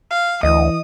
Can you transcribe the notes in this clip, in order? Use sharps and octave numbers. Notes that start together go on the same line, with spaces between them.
F5
D2 E3 D#5 D#6